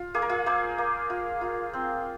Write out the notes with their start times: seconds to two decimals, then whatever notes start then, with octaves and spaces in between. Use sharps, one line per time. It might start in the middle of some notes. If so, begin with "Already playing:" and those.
Already playing: F4
0.14 A#3 G#4
0.22 A#4
0.29 F4 G#4
0.46 A#3 G#4 C5
0.78 A#3
1.10 F4
1.41 F4
1.73 C4